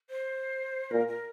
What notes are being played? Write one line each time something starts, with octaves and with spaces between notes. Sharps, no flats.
C5
A#2 A#4
A#4